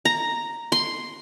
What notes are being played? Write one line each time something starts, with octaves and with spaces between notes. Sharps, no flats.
A#5
C6